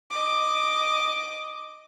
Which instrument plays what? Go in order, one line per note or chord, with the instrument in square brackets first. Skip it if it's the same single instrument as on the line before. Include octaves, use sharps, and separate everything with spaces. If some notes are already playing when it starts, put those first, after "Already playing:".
[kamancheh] D#5 D6